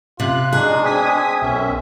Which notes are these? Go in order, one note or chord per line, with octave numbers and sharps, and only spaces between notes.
C3 F4 F#6
B2 G#3 D4 D#4 G#4
C4 G#5 D#6 B6
B1 F#2 C#4 E5